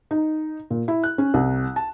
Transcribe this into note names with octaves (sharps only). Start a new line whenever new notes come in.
D#4
A#2
E4
F#6
C#4
C2
A5